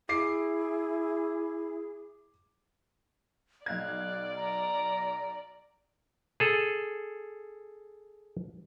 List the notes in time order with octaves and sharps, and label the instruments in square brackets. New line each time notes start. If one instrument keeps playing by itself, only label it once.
[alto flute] E4 [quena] G#4 [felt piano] D6 C7
[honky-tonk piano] B1 F5 G#6 [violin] D5 [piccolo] F#6
[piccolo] A#5
[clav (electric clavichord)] G#4 A4